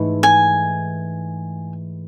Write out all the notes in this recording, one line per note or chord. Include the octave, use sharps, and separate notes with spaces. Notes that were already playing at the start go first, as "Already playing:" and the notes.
Already playing: G#2 E3 A3
G#5